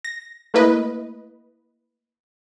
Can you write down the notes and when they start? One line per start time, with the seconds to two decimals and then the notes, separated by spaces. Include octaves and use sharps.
0.05 A#6
0.54 A3 A#3 E4 B4 D#5